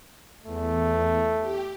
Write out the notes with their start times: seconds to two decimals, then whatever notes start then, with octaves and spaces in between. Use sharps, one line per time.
0.46 E2 A3
1.41 G4